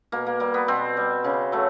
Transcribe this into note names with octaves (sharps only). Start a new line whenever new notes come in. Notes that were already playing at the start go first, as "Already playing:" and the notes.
B2 A#3
A#3
G3 A#3
B3
B2 C4
G3
C#3
F#3 A3